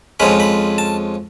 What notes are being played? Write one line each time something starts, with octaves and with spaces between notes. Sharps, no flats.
F2 F3 G#3 C#4 B5
B5
A5